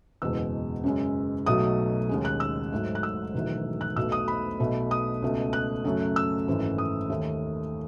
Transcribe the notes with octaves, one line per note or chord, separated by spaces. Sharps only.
F#1 E2 B2 G#3 E6
F#2 C#3 G#3
B1 B2 F#3 A3 D#6
D#2 C#3 G#3
F#6
E6
G#1 G#2 F#3 A3
F#6
E6
E1 E2 D#3 F#3 A3
F#6
B1 B2 A3 E6
D#6
B5
B1 B2 A3
D#6
C#2 B2 A3
F#6
F#2 C#3 F#3 A3
E6
G#1 F#2 E3 A3
D#6
D#2 D#3 A3